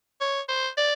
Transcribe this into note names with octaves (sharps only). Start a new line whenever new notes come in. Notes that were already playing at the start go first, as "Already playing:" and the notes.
C#5
C5
D5